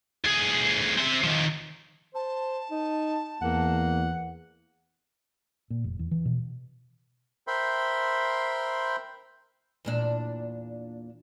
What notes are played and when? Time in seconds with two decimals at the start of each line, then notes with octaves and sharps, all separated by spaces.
0.25 D2 G#4
0.98 C4 E5
1.24 D#3 F3
2.14 C5 A5
2.71 D#4
3.42 E2 A#3 F#5
5.70 A#2
5.84 F1
5.99 E2
6.11 E3
6.25 B2
7.47 A#4 C5 E5 G5 B5 C6
9.85 E2 A#2 D4